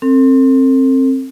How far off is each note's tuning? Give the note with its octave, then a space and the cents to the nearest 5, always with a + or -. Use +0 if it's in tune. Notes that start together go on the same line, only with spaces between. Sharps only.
C4 +20 A4 +45